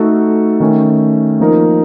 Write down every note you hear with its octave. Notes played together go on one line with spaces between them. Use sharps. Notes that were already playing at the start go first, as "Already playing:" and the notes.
Already playing: A3 D#4 F#4 A4
D#3 A3 C#4
F3 A#3 D#4 A#4